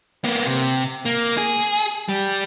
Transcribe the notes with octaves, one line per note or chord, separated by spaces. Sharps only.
A#3 B3
C3
A#3
G#4
G3